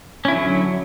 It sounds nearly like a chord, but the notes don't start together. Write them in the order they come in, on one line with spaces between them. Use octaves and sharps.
C#4 E4 D3 F#3